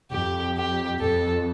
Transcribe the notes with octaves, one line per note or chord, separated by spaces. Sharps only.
F2 G4
G4
F2 A4